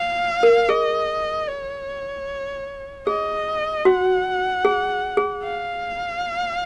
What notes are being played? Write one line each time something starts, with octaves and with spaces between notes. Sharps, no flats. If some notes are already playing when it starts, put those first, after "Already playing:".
Already playing: F5
A#4
G#4 D#5
C#5
G#4 D#5
F#4 F#5
G#4
G#4
F5